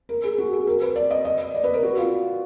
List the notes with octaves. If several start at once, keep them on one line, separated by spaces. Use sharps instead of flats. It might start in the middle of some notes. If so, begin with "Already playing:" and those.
A#4
G#4
F#4
G#4
A#4
B4
D5
D#5
D#5
D5
B4
A#4
F#4
F4